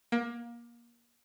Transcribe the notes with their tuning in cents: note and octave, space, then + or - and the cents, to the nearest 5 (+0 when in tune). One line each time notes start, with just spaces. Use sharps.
A#3 +25